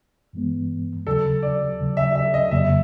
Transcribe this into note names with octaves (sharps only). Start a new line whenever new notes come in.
G2 E3 G#3 B3
D#2 C#3 F#3 A4
D5
D#2 C#3 F#3
E5
E5
D#5
F2 C#3 F#3 A#3 E5